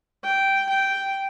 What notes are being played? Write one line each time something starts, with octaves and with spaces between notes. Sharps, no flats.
G5
G5